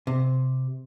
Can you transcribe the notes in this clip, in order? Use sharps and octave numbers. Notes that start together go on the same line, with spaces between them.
C3